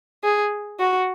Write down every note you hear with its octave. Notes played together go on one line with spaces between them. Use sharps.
G#4
F#4